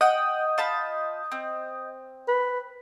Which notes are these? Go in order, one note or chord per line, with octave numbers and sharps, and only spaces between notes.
D#5 F#5 G5 D#6 G6
F4 A5 B5
C4
B4